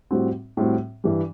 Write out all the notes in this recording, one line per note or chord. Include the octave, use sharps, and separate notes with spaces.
A2 G3 C4 F#4
A2 G3 C4 F#4
G2 E3 G3